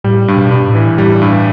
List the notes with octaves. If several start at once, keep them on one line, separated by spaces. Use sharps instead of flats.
A2 G3
G2
B2
G2
A2
E3
A2 G3
G2